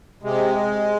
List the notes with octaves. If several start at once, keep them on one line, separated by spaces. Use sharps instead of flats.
C3 G#3